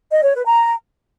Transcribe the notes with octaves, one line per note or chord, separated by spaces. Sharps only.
D#5
C#5
B4
A#5